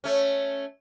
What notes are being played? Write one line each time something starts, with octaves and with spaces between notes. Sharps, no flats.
A3 C#4